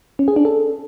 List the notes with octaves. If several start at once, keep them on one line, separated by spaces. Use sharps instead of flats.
C#4
G#4
D4
A4